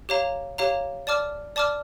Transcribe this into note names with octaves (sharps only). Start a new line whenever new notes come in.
G4 C#5 F5 A#5
G4 C#5 F5 A#5
D5 A5 D6 F6
D5 A5 D6 F6